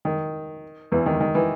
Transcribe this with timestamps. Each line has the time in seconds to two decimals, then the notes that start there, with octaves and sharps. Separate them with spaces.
0.05 D#3
0.92 E2 E3
1.06 D#3
1.20 D#3
1.35 E3